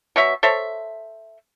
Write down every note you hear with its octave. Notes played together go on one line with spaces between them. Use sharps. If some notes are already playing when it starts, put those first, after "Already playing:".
B2 C#5 E5
A4 C5 C#5 E5